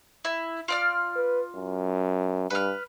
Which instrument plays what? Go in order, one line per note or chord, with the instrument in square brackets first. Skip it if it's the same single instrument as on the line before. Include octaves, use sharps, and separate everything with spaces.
[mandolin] E4
F4 D5 F6
[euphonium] B4
F#2
[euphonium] G2 [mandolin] B4 F6